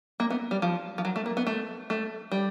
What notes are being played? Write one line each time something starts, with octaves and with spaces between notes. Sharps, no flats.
A#3
B3
G3
F3
F3
F#3
A3
A#3
B3
A3
A3
G3